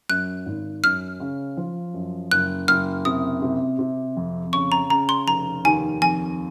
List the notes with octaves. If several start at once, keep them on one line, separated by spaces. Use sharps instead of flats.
F#2 F#6
G#1
F#2 F6
C#3
F3
F#2
F#1 F#6
F#1 F6
C3 D#6
C3
C3
F2
C#3 C#6
A#5
C#3 A#5
C6
F1 A#5
D#2 G#5
F2 G#5